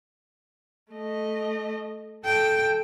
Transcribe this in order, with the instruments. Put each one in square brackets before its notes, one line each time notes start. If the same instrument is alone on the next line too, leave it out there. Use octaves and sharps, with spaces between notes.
[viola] A3 D#5
[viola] A4 [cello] G5